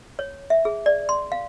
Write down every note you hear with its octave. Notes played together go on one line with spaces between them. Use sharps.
C#5
E5
G#4
D5
C6
F5